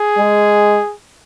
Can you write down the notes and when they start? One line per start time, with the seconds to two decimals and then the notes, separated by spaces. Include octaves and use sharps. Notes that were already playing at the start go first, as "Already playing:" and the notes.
Already playing: G#4
0.18 G#3